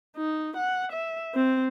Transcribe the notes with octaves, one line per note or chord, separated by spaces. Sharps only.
D#4
F#5
E5
C4